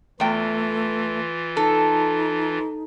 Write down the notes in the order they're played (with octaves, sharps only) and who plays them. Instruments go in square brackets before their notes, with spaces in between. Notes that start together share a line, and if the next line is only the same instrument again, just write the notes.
[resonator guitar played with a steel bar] E2 G5 [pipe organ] E3 F4 [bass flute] A3
[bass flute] D#4 [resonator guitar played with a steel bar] A4